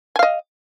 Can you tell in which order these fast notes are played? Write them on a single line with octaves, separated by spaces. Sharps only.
G#5 F5 D#5